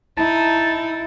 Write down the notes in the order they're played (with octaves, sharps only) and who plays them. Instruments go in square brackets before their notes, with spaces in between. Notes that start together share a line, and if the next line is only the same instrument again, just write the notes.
[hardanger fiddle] D#4 [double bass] E4 [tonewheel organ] A5